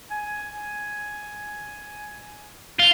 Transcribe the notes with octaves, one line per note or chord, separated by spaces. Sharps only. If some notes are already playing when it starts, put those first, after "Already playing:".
G#5
F4